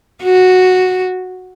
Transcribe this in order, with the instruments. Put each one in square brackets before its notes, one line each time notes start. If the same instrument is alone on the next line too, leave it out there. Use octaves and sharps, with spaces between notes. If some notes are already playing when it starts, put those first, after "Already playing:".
[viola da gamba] F#4